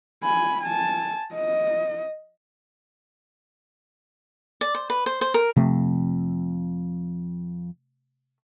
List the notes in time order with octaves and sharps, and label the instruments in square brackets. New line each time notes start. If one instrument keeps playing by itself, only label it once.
[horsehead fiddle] G#5 B5
G#5 A5
D#5
[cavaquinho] D5
C5
B4
C5
C5
A#4
[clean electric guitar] F2 [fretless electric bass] C3 A3